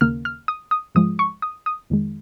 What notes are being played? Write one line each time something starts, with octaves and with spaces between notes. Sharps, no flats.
D#2 C#3 A#3 F6
F6
D#6
D#6
G#2 F3 G#3 D#6
C#6
D#6
D#6
F2 D#3 G#3